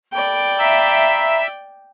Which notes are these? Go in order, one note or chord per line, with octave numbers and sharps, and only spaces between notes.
A4 D5 G5 B5
E5 F5 A#5 B5 E6